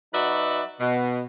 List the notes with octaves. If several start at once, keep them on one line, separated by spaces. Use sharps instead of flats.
F#3 D#4 F#4 B4 D5 E5
B2